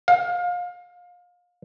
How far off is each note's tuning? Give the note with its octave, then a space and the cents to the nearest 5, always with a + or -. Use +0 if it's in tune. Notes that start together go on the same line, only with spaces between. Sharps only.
F5 +30